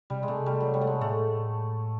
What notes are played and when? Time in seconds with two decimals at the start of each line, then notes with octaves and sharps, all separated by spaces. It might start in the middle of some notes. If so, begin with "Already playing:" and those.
0.10 C3 G3
0.23 G#3
0.28 C3 A3
0.46 G3
0.61 F#3
0.74 G3
0.81 A3
0.87 G#3
1.01 A2 A3